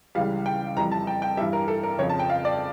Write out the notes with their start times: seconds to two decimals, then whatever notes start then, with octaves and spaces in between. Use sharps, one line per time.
0.15 C#2 C#3 E3 G3 F5
0.46 G5
0.77 F2 E3 G3 A#5
0.91 A5
1.07 G5
1.22 G5
1.37 G3 E5
1.40 G2 E3
1.53 A#4
1.68 A4
1.83 A#4
1.99 F2 C#3 F3 C#5
2.09 A5
2.19 G5
2.30 F5
2.45 D5